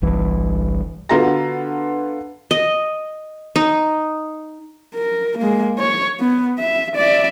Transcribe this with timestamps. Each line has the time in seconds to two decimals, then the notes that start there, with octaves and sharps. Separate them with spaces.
0.02 G1 C2 E3
1.09 D3 B3 F4 F#4 A#5 A#6
2.51 D#5
3.56 D#4
4.95 A#4
5.39 G#3 A#3
5.78 C#5
6.20 B3
6.59 E5
6.96 D5 E5